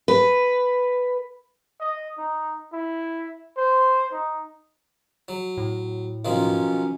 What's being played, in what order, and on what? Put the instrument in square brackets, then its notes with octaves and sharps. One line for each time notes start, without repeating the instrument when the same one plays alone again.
[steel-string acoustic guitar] B4
[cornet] D#5
D#4
E4
C5
D#4
[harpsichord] F#3
[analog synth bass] A2
[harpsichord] B1 D#3 F3 [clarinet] C#4